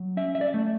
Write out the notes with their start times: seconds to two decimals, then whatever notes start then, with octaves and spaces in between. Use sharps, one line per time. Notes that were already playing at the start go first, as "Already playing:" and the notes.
Already playing: F#3
0.17 C#4 E5
0.35 E5
0.41 D5
0.54 A3